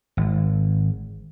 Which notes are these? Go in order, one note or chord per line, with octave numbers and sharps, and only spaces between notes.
G#1